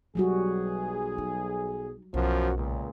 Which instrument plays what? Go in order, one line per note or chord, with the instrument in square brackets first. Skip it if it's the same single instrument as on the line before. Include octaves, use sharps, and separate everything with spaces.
[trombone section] B1 G#4 [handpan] F#3 G3 F#4
[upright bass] D#4
[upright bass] B1 [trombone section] F#2 F3 F#4
[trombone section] C#2 A#2